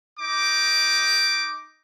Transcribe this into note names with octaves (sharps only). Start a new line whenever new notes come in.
D#4 D6